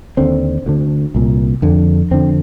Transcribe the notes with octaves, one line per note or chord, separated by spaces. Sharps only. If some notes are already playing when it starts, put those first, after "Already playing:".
D#2 D3 C4
D2 D3
C2 A#2
F2 D3
F2 D3 C4